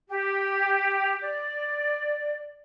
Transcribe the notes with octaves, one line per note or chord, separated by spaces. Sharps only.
G4
D5